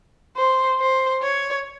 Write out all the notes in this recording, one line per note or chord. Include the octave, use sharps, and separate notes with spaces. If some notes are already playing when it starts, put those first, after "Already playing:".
C5
C5
C#5